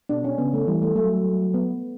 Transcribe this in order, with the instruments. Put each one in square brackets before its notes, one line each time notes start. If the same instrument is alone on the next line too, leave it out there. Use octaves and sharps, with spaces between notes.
[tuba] B2 [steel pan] D4
[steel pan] C#4
[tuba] C#3 [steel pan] B3
[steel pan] A3
[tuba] E3 [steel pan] G3
[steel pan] A3
[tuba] F#3 [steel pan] A3
[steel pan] B3